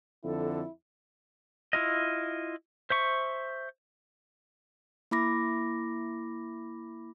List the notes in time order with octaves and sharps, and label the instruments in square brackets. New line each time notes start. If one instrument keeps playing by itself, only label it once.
[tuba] F2 [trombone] D3 [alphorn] E4 [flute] A4
[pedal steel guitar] E4 F4 D#5
C5 E5 C#6
[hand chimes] A#3 E4 B5 D6 A#6